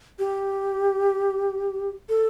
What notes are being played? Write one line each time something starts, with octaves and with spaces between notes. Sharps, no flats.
G4
A4